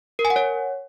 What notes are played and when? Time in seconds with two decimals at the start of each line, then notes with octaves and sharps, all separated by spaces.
0.19 A#4
0.25 G#5
0.30 F#5
0.36 C#5